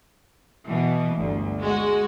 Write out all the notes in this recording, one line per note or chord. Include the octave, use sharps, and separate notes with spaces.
B2 E3
G1 D2
G#3 F#4